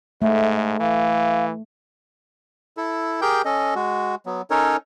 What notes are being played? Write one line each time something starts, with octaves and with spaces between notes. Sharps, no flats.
G#2 A3 E5
E3 F5
E4 A4
G4 G#4 A#4 G5 G6
C#4 A4 D#5
G#3 F#4
F#3 B3
C#4 D#4 A4 A#4 C#5